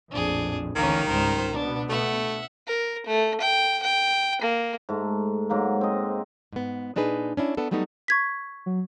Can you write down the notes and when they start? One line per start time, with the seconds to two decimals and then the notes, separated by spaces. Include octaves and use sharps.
0.11 A#1 F2 A2 D4 G#4
0.76 A1 D2 D#3 E3 A#3 C#4
1.08 C#2 G#2 G3 A#4 C5
1.53 B2 B3 D4
1.89 A3 E5 F#5
2.67 A#4
3.06 A3
3.41 G5
3.83 G5
4.42 A#3
4.89 G#2 A3
5.50 G#2 F#3 A#3
5.81 C4 D#5
6.53 G#2 B3
6.96 A#2 D4 D#4 G#4 B4
7.37 C#4 D4 E4
7.57 B3 D4 A4
7.71 F#3 G3 A3 B3 D#4
8.08 C#6 G#6 B6
8.66 F#3